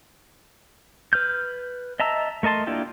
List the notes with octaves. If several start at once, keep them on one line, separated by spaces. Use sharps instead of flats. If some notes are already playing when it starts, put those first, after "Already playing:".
B4 F6 G6
D#5 E5 A5 A#5 E6
A3 A#4 D#5 A5 C6
A#3 D4 E4 F4 G4